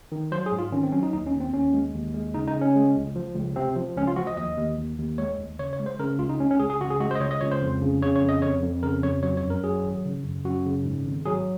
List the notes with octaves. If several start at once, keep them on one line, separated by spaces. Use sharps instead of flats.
D#3
F#3 C5
G#4
G#2
F4
D#3 C#4
C4
F#3 C#4
D#4
D#2 D#4
C#4
D#2
C4
D#2 C#4
G#3
D#2
G#3
C#3 D#4
D#4
C#3
C#4
G#3
C#2
F3
C#2
C3 C4
F3
C#2 C#4
F4
F3 F#4
D#5
D#2 D#5
D#2
D#2
D#2
G#3 C#5
D#2
C#3 C#5
C#5
G#3
C5
C#3 A#4
C#2 F4
D#4
C#2 C#4
C#4
C#2 G#4
G#4
C#3 F#4
G#4
G#3 F#4
C5
D#5
C#2 C#5
D#5
C#2 C#5
C5
F2
C#3
C#3 C#5
C#5
F2
D#5
F2 C#5
F2
C#3 A#4
F2 C#5
F#3 C#5
C#5
F#2
A#4
F#3 G#4
G#1
C#3
F#2
F#2 F#4
C#3
G#2
G#1
F#3 G#4